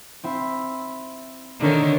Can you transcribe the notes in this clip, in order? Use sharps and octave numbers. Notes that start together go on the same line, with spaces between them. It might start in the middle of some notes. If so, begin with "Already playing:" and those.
C4 E4
D3 D#3 D4 D#4 C#5